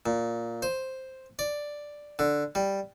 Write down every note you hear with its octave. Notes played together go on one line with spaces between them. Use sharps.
A#2
C5
D5
D3
G3